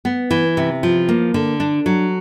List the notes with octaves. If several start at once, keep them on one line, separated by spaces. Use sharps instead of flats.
B3
E3
C3
F3
A#3
D3
D4
F#3